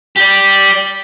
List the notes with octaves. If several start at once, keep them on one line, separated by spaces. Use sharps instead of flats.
G4 D5